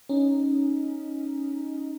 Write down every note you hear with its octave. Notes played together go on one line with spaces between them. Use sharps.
C#4 D#4